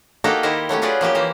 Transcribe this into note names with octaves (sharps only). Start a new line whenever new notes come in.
A#3 D#4 F#4 G4 A4
D#3 E4 G4 A#4 C5
F#3 A3 C#4 G4
C#4 F4 F#4 G#4 B4 D5
F3 A#3 C#4 G4
E3 A#3 C5